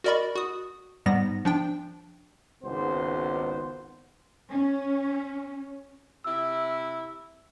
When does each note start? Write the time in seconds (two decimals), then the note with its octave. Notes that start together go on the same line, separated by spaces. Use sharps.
0.04 F#4 A#4 D5 D#5 B5 C#6
0.35 F#4 D#6
1.06 G#2 G3 B3 A#6
1.45 F3 D4 G5
2.64 G#1 C#2 B3 C5
4.50 C#4
6.24 C3 E4 E6